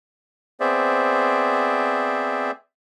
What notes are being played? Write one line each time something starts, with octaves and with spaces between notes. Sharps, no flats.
B3 C4 G#4 C5 D5 E5